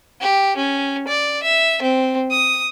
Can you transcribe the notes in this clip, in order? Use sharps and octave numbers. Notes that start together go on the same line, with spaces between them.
G4
C#4
D5
E5
C4
D#6